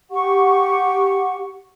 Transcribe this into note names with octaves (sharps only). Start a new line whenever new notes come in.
G4 F#5 C#6